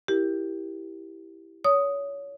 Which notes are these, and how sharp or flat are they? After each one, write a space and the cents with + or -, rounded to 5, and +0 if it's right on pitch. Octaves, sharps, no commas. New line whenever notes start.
E4 -5 G4 +0 A#4 +0
C#5 +25 D#6 +0